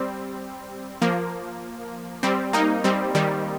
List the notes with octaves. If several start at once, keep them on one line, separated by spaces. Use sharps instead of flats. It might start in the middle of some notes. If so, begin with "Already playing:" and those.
Already playing: G3 C4
F3 A#3
G3 C4
A#3 D#4
G3 C4
D#3 G3